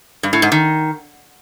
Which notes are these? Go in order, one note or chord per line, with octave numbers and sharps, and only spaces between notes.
G2
A2
G#2
D#3